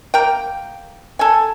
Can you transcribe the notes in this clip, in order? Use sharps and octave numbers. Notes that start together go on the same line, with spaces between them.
A#3 A#4 G5
A4 G#5